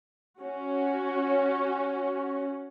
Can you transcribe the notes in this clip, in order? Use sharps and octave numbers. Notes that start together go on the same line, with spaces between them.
C#4 F#4